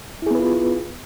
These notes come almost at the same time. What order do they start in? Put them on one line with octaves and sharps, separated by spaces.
E4 G#4 B3 B4 F4